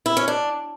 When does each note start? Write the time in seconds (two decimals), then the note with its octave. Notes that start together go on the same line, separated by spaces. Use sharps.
0.06 E4
0.17 C#4
0.28 D4